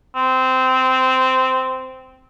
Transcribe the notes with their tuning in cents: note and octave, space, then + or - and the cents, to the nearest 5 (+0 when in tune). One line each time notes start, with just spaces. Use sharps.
C4 -15